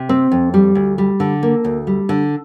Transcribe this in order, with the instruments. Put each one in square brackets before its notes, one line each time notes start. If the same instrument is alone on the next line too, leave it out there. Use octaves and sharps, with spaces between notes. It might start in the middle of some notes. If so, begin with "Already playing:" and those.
Already playing: [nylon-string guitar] C3
C4
F2
G3
D2
G3
D3
A#3
D2
G3
D3